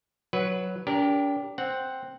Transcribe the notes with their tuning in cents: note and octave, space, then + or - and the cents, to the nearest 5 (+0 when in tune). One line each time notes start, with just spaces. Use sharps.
F#3 +0 B4 +0
D4 -40 G4 +0 A#4 +0
C4 +0 F#5 +0